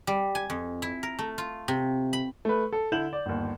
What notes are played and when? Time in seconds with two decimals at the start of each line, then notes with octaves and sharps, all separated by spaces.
0.07 G3
0.35 G#5
0.50 F2
0.82 E4
1.03 A#4
1.19 A3
1.38 F4
1.68 C3
2.13 B5
2.45 A3 B4
2.73 A4
2.92 D3 E4 A4 G6 E7 F#7
3.13 D5
3.26 G1 D#2